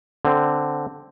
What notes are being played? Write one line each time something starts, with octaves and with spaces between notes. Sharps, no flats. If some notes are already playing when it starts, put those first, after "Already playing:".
D3 C4